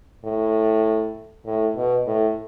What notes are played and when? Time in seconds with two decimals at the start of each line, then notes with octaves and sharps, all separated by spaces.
0.24 A2
1.46 A2
1.76 B2
2.07 A2